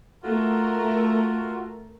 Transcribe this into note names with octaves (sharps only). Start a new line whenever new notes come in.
A3 F4 F#4 A#4